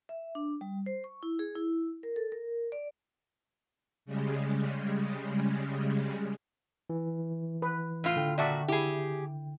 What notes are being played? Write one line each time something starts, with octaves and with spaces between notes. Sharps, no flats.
E5
D4
G3
C5
C#6
E4
G#4
E4
A#4
A4
A#4
D5
C#3 G3 G#3
E3
B4
A2 F4
D3 G5
A#2 F#4 D5 E5 A5
E4 G4 G#4